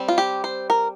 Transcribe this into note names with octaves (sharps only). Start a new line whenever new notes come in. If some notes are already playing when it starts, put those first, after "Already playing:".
Already playing: G3 C4
F4
G4
C5
A#4